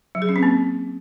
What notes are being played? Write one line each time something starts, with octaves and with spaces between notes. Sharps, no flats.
F#3
G#4
C#4
C4
A#3